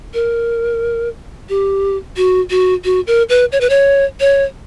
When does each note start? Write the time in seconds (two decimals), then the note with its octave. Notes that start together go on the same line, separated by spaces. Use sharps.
0.14 A#4
1.49 G4
2.17 F#4
2.50 F#4
2.85 F#4
3.07 A#4
3.29 B4
3.52 C#5
3.61 B4
3.70 C#5
4.20 C#5